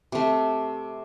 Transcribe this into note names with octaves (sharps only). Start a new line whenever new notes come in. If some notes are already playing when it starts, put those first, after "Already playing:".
C3 A3